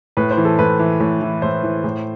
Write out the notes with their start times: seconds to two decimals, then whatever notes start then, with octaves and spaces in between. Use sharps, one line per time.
0.17 A2 B4
0.31 C5
0.37 E3
0.45 A4
0.59 A2 B4
0.79 E3
1.00 A2
1.22 E3
1.42 A2 C5
1.63 E3
1.84 A2